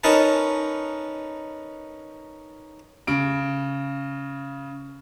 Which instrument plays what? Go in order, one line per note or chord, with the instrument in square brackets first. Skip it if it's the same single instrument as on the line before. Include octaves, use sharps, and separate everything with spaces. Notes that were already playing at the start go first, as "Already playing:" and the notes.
[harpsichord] C#4 D#4 A#4 B4 A5
[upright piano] C#3 D7